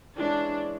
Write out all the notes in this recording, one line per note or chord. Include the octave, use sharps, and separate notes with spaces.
E3 G#3 C#4 D4